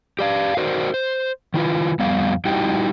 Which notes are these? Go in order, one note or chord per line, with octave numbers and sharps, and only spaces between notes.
G4 D5 F5
F#4 A#4 C5 D5
C5
D#3 E4 F4 B4
F2 G3 B3 F5
G3 D#4 E4 F#4 G4 G5